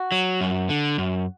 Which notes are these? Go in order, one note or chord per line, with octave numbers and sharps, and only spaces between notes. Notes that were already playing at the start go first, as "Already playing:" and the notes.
Already playing: F#4
F#3
F#2
D3
F#2